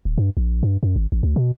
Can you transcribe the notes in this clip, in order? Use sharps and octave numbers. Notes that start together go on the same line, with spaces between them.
D1
G2
A#1
G2
F#2
G#1
A1
D2
B2